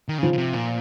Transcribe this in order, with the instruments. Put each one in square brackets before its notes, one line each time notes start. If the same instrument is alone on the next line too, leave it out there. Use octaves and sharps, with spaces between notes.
[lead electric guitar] D#3
[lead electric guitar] C#3 [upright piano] F3
[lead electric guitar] C#3
C3
A#2